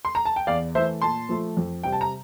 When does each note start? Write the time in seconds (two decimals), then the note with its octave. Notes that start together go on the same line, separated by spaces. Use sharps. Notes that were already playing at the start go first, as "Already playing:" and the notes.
0.05 C6
0.15 A#5
0.25 A5
0.36 G5
0.47 E2 D5 F5
0.75 E3 A3 C5 E5
1.02 A#2 A5 C6
1.29 F3 A3
1.57 F2
1.83 C3 G3 G5
1.93 A5
2.01 A#5